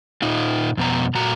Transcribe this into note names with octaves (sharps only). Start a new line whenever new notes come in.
A#2 D#4 F4
F2 B2 A#5
A#2 F#4 A#5